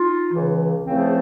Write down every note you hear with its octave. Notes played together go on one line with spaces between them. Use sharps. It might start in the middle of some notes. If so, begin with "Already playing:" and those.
Already playing: D#4 F4
C#2 C#3 E3
E2 C#3 F3 A3 C4